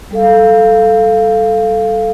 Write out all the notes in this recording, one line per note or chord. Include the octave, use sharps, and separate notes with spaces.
G3 A4 F5